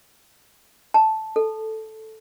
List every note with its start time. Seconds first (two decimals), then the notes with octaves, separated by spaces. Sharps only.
0.94 A5
1.36 A4